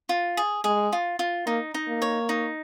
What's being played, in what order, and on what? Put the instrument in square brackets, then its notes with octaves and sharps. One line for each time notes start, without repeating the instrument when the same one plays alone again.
[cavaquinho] F4
G#4
[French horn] G#3 [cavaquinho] G#4
[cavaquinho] F4
F4
[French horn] A#3 [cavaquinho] D#4
[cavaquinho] D#4
[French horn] A#3
[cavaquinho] C#5
D#4